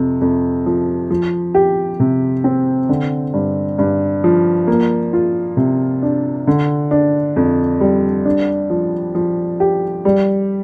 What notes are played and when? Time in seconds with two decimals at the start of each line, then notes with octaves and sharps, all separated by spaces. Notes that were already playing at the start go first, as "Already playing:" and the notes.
Already playing: F2 C3
0.21 F2
0.66 F3
1.10 F3
1.54 G4
2.00 C3
2.44 C4
2.89 D3
3.34 G2
3.78 G2
4.24 F3
4.67 A#3
5.13 F4
5.57 C3
6.02 D4
6.47 D3
6.91 D4
7.36 F2
7.81 G3
8.25 D4
8.70 F3
9.15 F3
9.60 G4
10.05 G3